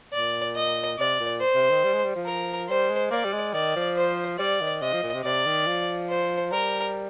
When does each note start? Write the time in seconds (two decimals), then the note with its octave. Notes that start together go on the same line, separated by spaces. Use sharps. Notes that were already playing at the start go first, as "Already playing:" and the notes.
0.13 A#2 D5
0.56 D#5
0.99 C3 D5
1.20 A#2
1.41 C5
1.55 C3
1.70 D#3
1.84 G3
1.94 G#3
2.04 G3
2.16 F3
2.26 A#4
2.69 G3 C5
2.90 G#3
3.11 A#3 D5
3.25 G3
3.33 G#3
3.54 D#3 D5
3.76 F3
3.97 C5
4.39 G3 D5
4.61 D#3
4.82 C3 D#5
4.93 F3
5.03 A#2
5.14 C3
5.24 C3 D5
5.46 D#3
5.67 F3
6.10 C5
6.52 G3 A#4